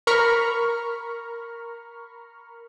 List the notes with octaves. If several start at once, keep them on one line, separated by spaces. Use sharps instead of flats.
A#4 A#5 B5 C#6 F6